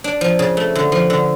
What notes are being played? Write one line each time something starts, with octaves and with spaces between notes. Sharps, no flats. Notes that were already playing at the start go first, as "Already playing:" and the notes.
D4
F3
C#3
A3
D3
F3
D3